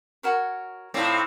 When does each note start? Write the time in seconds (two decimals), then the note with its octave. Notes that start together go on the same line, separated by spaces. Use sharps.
0.23 F#4 A#4 C#5
0.94 A2 A3 C4 D#4 F4 D5